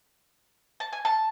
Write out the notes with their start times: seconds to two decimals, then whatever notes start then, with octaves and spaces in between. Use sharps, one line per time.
0.80 A5
0.93 G#5
1.05 A5